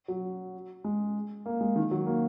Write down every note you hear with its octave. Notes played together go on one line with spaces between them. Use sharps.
F#3
G#3
A#3
G#3
D#3
F#3
A#3